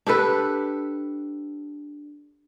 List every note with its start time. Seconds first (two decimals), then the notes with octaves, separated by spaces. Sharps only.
0.07 D4 G4 A4 B4